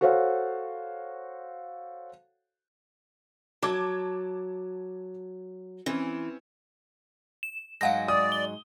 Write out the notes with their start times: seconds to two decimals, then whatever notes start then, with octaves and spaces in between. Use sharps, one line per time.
0.01 F#4 A4 C5 C#5 F5 F#5
3.63 F#3 A5 D6 G#6
5.86 E3 C4 C#4
7.43 E7
7.81 G#2 F#3 F5 F#5 A#6
8.08 D5 D#6
8.32 G7